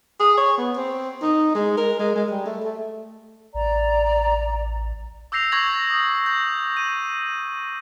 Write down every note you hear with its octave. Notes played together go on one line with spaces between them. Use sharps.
G#4
C#5
B3
C4
D#4
G#3
A#4
G#3
G#3
G3
A3
A3
A1 D5 A#5
D6 E6 G6 A#6 C7 F7
C#6 G6 G#6 A#6 F#7
D#6
G6
D#7 F#7